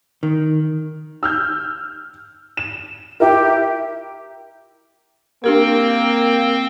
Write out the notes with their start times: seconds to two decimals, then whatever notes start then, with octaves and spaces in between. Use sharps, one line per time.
0.23 D#3
1.23 E6 F6 G6
2.57 E7
3.20 E4 G4 A#4
5.44 A#3 C4 D4 G4 A#4 G5